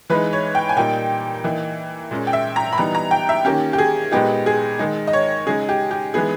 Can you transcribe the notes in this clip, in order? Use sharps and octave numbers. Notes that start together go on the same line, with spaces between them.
E3 G#3 D#4 B4
C#5
G5
G#5
A#2 G3 A#3 D#4 G5
E3 A#3 D#4
A#2 G#3 C#4
G5
E5
A#5
B5
E3 G3 B3 D#4 A#5
A#5
G5
E5
D#3 A#3 C#4 G4
G4
G#4
A#2 G#3 B3 D#4 G4
G#4
D#3 G#3 D#4
D#5
C#5
C#3 G#3 D#4 G#4
G4
G4
E3 G#3 B3 D#4 G#4